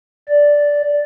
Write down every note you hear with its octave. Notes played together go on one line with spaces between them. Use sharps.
D5